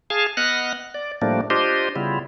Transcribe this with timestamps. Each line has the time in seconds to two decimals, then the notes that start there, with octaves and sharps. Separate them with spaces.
0.10 G#4 F5 G#5 A5
0.37 B3 D#5 F#5 F6 F#6
0.94 D5
1.22 A2 F3 G3 A3 A#3 D4
1.50 D4 F4 G4 C5 D#5
1.96 C#3 G3 B3 E4 F4